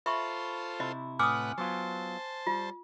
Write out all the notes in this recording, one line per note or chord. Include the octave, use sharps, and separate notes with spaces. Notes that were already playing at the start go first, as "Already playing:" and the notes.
F4 A4 C5 E5 B5 C#6
C3 E4 D#5
A2 B4 F#5 G#5 D6 D#6 F6
F#3 B3 F4 C5 A5
G3 F4